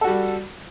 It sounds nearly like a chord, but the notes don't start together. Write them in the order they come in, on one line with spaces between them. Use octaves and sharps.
A4 F#4 G3